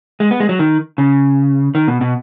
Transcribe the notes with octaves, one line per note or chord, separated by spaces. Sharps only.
G#3
B3
G#3
F#3
D#3
C#3
D#3
B2
B2